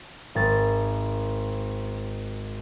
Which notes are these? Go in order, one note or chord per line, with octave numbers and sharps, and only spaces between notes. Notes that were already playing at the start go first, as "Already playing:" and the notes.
G#1 A6